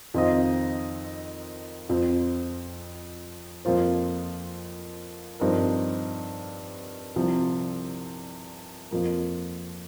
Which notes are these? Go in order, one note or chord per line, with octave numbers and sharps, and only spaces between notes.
F2 D#3 C4 F4 D#5
F2 F3 C4
F2 F3 A#3 F4 C5
G2 F3 C4 D#4 A#4
C2 C3 F3
F2 F3 A#3